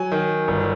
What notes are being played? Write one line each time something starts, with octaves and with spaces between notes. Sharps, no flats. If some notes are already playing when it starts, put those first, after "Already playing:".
Already playing: F#3 G#5
D#3
G1